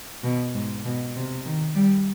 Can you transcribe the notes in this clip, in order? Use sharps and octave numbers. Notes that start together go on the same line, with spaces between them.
B2
G#2
B2
C3
D#3
G3